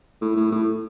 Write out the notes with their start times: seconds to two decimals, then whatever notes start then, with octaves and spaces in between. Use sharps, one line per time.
0.21 A2
0.36 A2
0.52 A2